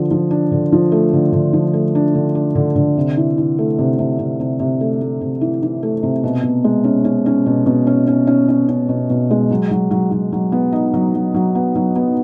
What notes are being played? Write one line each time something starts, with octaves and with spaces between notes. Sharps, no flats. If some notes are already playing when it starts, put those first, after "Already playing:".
Already playing: D3 F3
F3
D4
D3
F3
A3
D3
D3
F3
A3
D4
D3
D4
D3
D3
C3
E3
E3
A3
C3
C3
C3
C3
C3
A3
A3
C3
E3
E3
A3
C3
B2
B2
G#3
C#4
C#4
C#4
B2
B2
C#4
C#4
C#4
C#4
C#4
B2
B2
G#3
F#3
F#3
F#3
F#3
F#3
B3
D#4
F#3
F#3
F#3
B3
F#3
B3